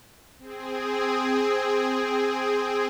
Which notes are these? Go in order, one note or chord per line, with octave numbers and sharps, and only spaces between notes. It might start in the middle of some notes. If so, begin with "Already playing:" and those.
C4 G#4